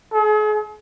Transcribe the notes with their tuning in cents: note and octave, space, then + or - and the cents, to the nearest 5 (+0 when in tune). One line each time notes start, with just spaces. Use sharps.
G#4 +40